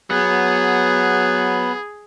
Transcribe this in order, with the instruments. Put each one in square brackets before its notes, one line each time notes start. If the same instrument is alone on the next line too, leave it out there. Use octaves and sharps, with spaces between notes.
[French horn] F#3 [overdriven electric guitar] B3 [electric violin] G#4